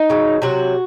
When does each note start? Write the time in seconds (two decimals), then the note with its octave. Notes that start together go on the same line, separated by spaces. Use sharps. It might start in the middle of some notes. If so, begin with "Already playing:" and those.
Already playing: D#4
0.10 C#3 F#3
0.42 C3 F#3 F#4